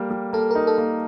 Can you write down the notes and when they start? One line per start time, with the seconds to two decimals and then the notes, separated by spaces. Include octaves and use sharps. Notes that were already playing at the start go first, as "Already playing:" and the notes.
Already playing: G3 A#3 A4
0.11 G3
0.33 A#3 A4
0.51 A#4
0.55 D#4
0.67 A4
0.78 A#3